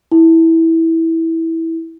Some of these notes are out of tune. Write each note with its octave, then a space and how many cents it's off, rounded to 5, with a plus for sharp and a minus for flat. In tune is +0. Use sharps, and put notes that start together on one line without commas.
E4 -15